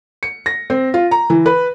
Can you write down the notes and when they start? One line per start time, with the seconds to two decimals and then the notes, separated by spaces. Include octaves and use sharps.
0.23 C#7
0.46 A#6
0.70 C4
0.94 F4
1.11 A#5
1.30 E3
1.46 B4